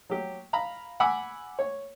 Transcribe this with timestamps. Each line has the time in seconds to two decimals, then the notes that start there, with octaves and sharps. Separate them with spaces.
0.10 F#3 G4
0.53 F5 A#5 B5
1.00 F#5 G#5 B5 D6 E6
1.59 C#5